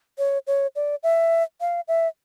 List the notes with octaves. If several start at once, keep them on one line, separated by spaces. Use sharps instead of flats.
C#5
C#5
D5
E5
F5
E5